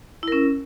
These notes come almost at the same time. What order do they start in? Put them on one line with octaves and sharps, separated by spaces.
E4 A#4 C#4